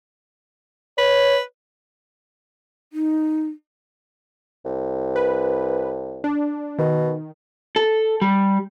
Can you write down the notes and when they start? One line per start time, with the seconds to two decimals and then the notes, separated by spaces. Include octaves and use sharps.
0.98 B4 C#5
2.93 D#4
4.65 C2
5.16 B4
6.24 D4
6.79 B2 D#3
7.76 A4
8.22 G3